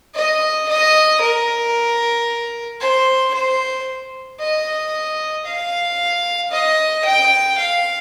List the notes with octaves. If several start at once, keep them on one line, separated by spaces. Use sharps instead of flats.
D#5
D#5
A#4
C5
C5
D#5
F5
D#5
G5
F5